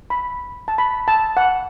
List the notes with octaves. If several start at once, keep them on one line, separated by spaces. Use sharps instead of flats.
B5
A5
B5
A5
F#5